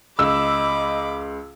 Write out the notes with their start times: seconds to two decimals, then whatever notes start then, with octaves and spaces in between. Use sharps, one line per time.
0.19 C#2 D#5 B5 D6 E6